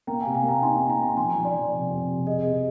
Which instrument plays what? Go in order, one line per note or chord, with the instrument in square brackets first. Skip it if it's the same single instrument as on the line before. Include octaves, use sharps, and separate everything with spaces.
[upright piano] A#3 [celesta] G5 A#5
[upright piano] C3 [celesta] F5 G#5
[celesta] F5 G#5
[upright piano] A#3 [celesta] G5 A#5
[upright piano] D#4 [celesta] G#5 C6
[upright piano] A#3
[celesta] G5 A#5
[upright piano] A#3
[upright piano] F3 [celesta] G#5 C6
[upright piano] F3
[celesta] D5
[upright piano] F3
C3
F2
C3
[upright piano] G#4 [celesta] D#5
[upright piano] C3